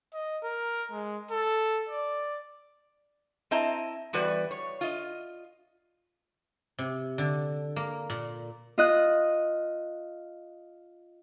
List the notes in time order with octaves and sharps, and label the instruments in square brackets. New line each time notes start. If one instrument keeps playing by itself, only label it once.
[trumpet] D#5
A#4
G#3
A4
D5
[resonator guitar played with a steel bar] C4 E4 D#5 A5 A#5
E2 G3 F#4 B4 D5
C#5
F4 D#5
[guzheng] C3
D3
A#3
A#2
[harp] F4 D#5 F#6